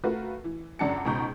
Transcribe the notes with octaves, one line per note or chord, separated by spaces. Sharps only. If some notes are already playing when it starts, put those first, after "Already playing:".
A3 F4 F#4 A#4 B4
E3
C#2 F#2 D4 F#5 A5 C#7
C#2 G#2 B2 A#5 C#6 G6